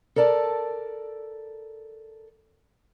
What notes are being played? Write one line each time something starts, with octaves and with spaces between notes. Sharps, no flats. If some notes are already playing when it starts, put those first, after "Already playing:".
A4 A#4 D5 A5